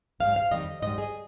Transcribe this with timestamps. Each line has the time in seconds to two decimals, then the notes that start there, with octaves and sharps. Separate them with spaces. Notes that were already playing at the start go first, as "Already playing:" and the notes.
0.20 G#2 D#3 G3 F5
0.36 F5
0.51 F2 D#3 G3 D#5
0.82 G#2 G3 D#5
0.98 G#4